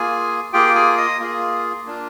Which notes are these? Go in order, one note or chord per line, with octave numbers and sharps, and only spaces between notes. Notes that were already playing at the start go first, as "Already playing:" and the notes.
Already playing: A#3 F4 G#4 G#5
A#3 F4 G4 G#4 G5
G#4 G#5
D#5 D#6
A#3 F4 G#4
A#3 D4 F4